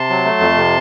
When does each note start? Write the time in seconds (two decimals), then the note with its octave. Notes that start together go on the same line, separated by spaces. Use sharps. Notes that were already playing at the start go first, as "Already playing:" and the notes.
Already playing: C3 A5 C6
0.10 F#3
0.25 A3
0.40 F2
0.57 C3